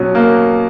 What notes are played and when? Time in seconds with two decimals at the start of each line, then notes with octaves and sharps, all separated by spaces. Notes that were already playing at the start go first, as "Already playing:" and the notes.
Already playing: B2 F#3 C#4
0.15 A#3